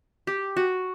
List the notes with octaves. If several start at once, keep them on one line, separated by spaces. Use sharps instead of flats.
G4
F#4